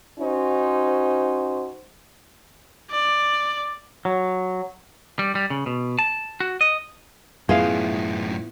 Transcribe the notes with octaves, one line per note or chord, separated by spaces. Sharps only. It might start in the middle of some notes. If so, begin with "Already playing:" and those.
C#4 D#4 F#4 C5
D5
F#3
G3
G3
C#3
B2
A5
F#4
D#5
F#2 A2 B3 E4 F4 G#4 F5